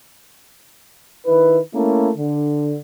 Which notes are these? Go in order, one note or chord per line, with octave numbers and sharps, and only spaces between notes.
D#3 E4 B4
A3 A#3 C#4 E4 A#4
D3